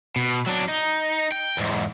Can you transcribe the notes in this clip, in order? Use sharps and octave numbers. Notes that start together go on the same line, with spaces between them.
B2
F#3 D4
D#4
G5
E2 G#2